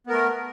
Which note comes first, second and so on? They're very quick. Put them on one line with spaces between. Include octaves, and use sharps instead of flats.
B3 A#4 A3